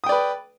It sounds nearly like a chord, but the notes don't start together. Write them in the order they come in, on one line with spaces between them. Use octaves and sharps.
D#6 G5 D5 B4